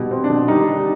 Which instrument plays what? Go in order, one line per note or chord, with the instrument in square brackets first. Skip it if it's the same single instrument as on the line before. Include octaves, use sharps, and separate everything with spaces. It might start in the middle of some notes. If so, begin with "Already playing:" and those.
Already playing: [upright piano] B2 G3
C4
D4
B2
G3 D#4
G3